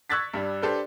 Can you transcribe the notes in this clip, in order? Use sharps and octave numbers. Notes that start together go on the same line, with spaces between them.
C#6 E6 F#6 G#6 A6 B6
G2 G3 D4
D4 G4 A4 B4 C5